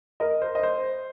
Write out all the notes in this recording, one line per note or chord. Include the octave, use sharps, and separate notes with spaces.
A#4 D#5
C5
D#5
C5